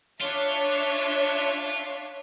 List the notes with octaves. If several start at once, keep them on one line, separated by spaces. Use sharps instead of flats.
D4 F4 C#5 E5